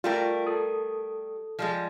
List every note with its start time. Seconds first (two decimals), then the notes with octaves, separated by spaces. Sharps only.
0.04 G3 A3 F4 A#4 G5
0.47 A4 D#6
1.59 F3 G3 G#3